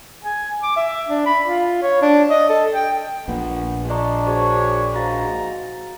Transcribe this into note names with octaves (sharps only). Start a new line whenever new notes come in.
G#5
D6
E5
D4
B5
F4
C#5
D4
D#5
A4
G5
A#1 A#2 B3
D4 D#5 A#5 C#6
F#4 G#4 C5 C#5
G#2 F#4 F5 A#5 A6